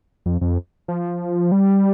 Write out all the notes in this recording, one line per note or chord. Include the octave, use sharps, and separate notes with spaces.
F2
F2
F3
G3